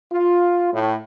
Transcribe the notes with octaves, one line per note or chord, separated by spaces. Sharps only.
F4
A2